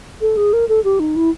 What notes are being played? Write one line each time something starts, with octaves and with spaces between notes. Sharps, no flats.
A4
G#4
A#4
A4
G4
D#4
E4